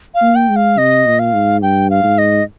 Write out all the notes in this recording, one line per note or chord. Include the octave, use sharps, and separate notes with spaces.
F5
A#3
G5
G#3
F5
C3 D#5
A#2
F5
G#2
G2 G5
F5
G#2
D#5